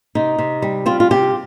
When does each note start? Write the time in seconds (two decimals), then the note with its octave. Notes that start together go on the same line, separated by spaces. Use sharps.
0.15 C3 D#4
0.38 C3
0.62 G3
0.86 C4 F4
1.00 F4
1.11 C3 G4